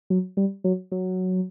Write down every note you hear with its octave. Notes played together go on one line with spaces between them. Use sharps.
F#3
G3
F#3
F#3